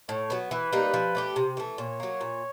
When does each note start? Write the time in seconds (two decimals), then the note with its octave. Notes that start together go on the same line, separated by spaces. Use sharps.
0.09 A2 C#5
0.30 F#3 B3
0.51 E3 B4
0.73 G3 A#3 D#4
0.94 F3
1.15 A3 D4 G4
1.36 C3
1.57 E3 A3
1.78 A#2 C#5
2.00 F#3 A#3
2.21 A#2